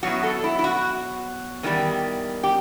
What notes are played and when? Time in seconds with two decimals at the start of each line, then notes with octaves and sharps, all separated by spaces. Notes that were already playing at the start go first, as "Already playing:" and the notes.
0.03 B2 F#3 B3 E4 F#4
0.23 A4
0.44 E4
0.59 E4
0.64 F#4
1.63 E2 D#3 G3
2.43 G4